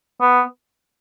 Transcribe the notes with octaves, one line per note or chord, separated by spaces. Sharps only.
B3